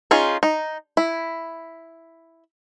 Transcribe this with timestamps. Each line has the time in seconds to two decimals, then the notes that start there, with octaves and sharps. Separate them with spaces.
0.11 C#4 D#4 F4 G#4
0.43 D#4
0.97 E4